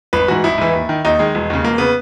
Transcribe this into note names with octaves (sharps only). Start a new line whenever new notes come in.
G#1 B4
G#2 E3 F#4
G#1 E4
G#2 E3
D#2
D#3
D#2 D#4
D#3 G#3
E1
D#2 C#3
E1 A#3
C#3 B3